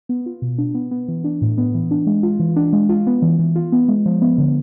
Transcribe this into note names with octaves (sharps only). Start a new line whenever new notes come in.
B3
F4
B2
D4
B3
B3
E3
D4
A2
B3
E3
D4
G#3
F4
E3
D4
G#3
F4
B3
E3
E3
F4
B3
G#3
F3
B3
D3